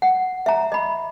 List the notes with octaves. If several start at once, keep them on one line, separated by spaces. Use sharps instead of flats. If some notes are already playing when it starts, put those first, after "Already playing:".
F#5
E5 A#5
D#5 B5